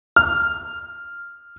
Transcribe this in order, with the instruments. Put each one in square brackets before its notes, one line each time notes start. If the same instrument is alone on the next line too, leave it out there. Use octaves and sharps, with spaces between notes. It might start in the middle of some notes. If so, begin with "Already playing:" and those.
[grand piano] F6